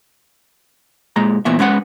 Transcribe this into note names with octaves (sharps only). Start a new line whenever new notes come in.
A#2 G#3 A#5
A#2 E3 B3 E5
G#3 C#4 B4 F#5